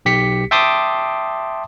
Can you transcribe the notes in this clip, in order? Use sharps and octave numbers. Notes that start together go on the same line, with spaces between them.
B1 G4 B6 C#7
E5 G5 A5 C6 D6 D#6